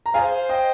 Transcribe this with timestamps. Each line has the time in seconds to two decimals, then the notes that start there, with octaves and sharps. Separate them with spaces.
0.06 A#5
0.14 F4 G#4 C5 F5 G#5
0.49 D#5 G5